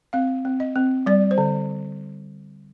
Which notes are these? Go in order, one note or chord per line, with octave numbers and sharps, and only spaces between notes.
C4 F5
C4
D#5
C4
G3 D5
C5
D3